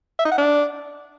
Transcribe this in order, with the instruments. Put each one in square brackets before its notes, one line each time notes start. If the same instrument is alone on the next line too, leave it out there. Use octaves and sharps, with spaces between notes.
[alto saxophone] E5
D#4
F#5
D4